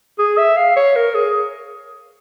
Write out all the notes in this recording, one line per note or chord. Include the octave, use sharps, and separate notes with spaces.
G#4
E5
F5
C#5
A#4
G#4